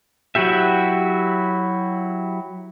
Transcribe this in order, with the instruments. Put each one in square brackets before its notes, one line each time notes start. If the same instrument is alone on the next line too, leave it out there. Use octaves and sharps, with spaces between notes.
[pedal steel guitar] F#3 E4 F#4 G4 E5